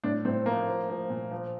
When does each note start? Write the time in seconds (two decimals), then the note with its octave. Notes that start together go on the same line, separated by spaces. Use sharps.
0.04 A2 D4
0.25 A2 C4
0.46 F3 A#3
0.67 F3
0.89 F3
1.10 A#2
1.31 F3